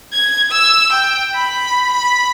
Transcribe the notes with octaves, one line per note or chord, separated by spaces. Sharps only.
G#6
E6
G5
B5
B5